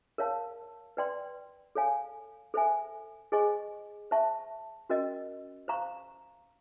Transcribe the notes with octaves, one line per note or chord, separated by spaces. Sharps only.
A#4 C#5 F5 A5
B4 D5 G5 C6
A4 C#5 F5 G#5
A4 C5 E5 G#5
G#4 C5 D#5 G#5 C#6
C5 E5 A5 C#6
C#4 F#4 A#4 D#5
C5 F5 A#5 C#6